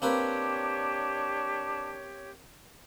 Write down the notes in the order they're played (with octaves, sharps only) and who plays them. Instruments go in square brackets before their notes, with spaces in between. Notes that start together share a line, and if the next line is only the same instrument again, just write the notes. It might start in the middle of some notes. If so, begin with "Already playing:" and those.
[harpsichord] A#3 C4 B4 [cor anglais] D4 [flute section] G4 C#5